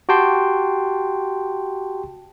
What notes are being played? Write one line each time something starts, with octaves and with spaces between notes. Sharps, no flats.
F#4 G4 G5 A5 C6